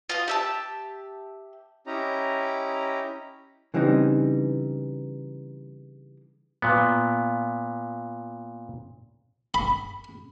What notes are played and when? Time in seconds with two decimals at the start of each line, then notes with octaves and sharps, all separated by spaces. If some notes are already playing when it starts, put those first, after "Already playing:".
0.09 F4 D#5
0.28 G4 E5 A5
1.87 C#4 E4 G4 D#5 A#5
3.74 C#3 E3 G3 C4 D#4
6.62 A#2 B3
9.54 B5